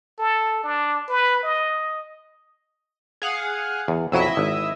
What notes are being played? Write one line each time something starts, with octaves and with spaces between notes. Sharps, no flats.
A4
D4
B4
D#5
G#4 F5 F#5
E2
B1 F2 F#3 E4 D#5 E5
G#1